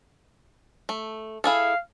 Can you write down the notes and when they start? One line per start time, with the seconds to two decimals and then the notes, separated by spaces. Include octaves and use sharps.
0.89 A3
1.44 E4 G#4 A4 F5